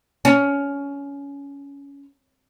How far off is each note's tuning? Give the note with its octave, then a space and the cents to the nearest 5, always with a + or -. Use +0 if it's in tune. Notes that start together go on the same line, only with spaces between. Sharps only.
C#4 +20